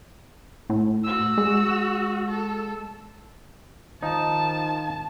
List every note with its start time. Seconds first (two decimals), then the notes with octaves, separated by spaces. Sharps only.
0.70 A2
1.04 F#4 E6
1.38 G#3
2.28 A4
4.03 D#3 F3 D#4 A5